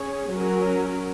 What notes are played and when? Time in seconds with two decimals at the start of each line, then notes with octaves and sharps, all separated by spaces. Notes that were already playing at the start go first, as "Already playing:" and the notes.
Already playing: C#4 G#4 C#5
0.29 F#3 C#4 F#4 A#4